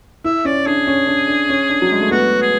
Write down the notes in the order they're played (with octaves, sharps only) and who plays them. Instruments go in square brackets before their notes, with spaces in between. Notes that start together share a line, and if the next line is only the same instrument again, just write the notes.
[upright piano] E4 [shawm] E5
[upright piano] C#4 [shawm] D5
[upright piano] D4 [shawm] G#4
[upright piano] C#4
D4
D4
C#4
D4
F#3
G#3
A3
[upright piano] B3 [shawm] F#4
[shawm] G#4